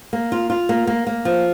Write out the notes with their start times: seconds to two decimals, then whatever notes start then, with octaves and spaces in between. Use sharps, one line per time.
0.13 A#3
0.32 F4
0.50 F4
0.69 A#3
0.87 A#3
1.07 A#3
1.25 F3